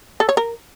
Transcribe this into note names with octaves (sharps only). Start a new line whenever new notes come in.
A4
C#5
A#4